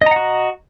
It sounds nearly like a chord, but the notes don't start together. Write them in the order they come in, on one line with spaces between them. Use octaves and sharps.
D#5 A#5 F#5 F#4